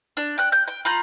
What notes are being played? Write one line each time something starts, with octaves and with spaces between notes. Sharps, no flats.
D4
G5 F#6
G6
G5
F4 A#5 B5 G6